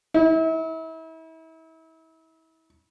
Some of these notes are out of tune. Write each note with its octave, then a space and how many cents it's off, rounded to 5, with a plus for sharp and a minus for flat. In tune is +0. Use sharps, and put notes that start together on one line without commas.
E4 -35